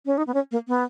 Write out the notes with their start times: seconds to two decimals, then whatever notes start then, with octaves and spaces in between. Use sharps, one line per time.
0.06 C#4
0.18 D#4
0.27 B3
0.34 C#4
0.52 A#3
0.68 B3